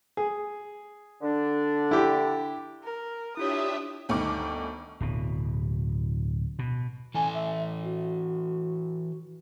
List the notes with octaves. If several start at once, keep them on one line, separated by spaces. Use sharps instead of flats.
G#4
D3 D4
E4 G4
A#4
D4 E4 F4 G4 C#5 E5 D#6
G1 D2 D#3 C#6 D6
D1 B2
B2
E3 A4 G#5
E5
F#4